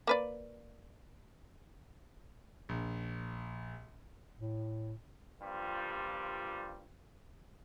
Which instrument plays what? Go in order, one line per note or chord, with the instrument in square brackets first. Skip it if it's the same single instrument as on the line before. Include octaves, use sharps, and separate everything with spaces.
[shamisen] A#3 B4 D5
[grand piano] A#1
[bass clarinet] A2
[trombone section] G2 F3 G3 A#3 F4